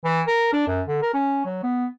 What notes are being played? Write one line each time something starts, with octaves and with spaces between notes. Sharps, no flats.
E3
A#4
D4
F#2
D3
A#4
C#4
F#3
B3